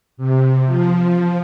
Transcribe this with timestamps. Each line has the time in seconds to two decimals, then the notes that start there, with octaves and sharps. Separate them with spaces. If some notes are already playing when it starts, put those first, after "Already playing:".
0.17 C3
0.66 F3